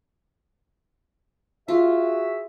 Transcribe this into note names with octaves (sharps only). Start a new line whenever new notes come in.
F4 F#4 G#4 E5